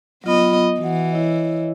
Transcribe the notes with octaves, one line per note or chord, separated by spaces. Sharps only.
F#3 B3 F4 D#5 B5
E3 F#4 F#5
E4 C#5 D#5